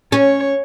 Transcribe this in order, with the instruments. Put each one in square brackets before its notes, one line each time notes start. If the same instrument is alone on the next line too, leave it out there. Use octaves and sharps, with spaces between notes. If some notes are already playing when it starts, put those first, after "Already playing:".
[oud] C#4 [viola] C#5